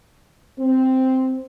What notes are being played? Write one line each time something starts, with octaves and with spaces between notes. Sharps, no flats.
C4